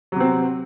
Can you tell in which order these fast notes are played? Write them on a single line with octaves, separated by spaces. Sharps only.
F#3 C3 C4